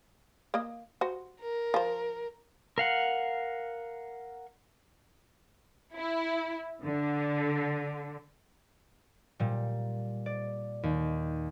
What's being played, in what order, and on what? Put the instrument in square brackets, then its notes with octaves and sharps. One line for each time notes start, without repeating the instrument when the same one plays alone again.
[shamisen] A#3 D#5
F#4 C5
[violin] A#4
[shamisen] F3 C5
[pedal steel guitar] A#4 F5 F#5
[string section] E4
D3
[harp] A#2 G3
D5
D#2